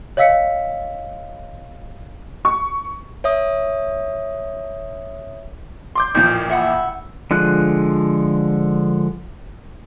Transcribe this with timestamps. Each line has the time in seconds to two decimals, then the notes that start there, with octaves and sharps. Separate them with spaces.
0.17 C#5 D#5 F5 E6 B6 C#7
2.45 C#6
3.24 C#5 E5 D#6
5.95 C6 D6 G6
6.15 A1 A#2 F3 A#4 G6
6.50 E5 F#5 B5
7.31 D3 F3 G#3 F#6